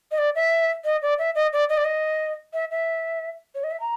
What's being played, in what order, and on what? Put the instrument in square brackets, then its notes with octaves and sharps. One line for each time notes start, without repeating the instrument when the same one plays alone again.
[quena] D#5
D5
E5
D#5
D5
E5
D#5
D5
D#5
D5
D#5
E5
E5
C#5
D#5
E5
A#5